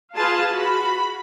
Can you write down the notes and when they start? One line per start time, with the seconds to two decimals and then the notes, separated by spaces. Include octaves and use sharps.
0.15 F4 G#4 B4 F5 A5
0.52 F#4 B5